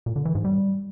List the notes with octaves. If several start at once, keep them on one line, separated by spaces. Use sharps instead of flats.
A#2
D3
E3
G#2
G3